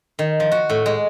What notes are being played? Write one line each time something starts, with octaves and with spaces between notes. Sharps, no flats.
D#3
F3
F#4
A2
G#3